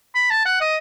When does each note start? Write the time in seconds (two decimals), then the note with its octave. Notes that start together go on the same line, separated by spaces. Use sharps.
0.15 B5
0.30 A5
0.45 F#5
0.60 D#5